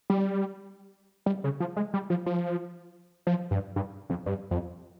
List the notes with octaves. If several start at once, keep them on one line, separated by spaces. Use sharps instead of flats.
G3
G3
C#3
F3
G#3
G3
F3
F3
F3
G2
G2
F2
G2
F2